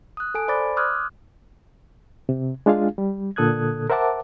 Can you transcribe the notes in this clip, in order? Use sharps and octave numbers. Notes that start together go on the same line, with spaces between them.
D#6 F#6
A4 G#5 D7
C5 D5 B5 D6 A6
C6 D6 D#6 F6 F#6 G#6
C3
G#3 D4 F4 G#4 F5
G3
A#2 D3 A4 D#6 F#6 G#6
A#4 C5 E5 F#5 A5 D6